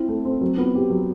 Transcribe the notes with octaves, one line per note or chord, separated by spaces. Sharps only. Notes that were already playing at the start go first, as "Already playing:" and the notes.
Already playing: C4 E4
A3
C4
F#3
B3
G4
F#3